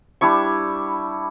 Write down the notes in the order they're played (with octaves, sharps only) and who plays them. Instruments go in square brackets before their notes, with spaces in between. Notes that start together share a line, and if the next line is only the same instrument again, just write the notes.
[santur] G3 D4 E4 C#6